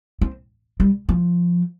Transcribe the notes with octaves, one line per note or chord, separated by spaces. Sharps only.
C4
G3
F3